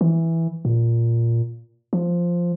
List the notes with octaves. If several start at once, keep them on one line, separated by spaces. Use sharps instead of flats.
E3
A#2
F3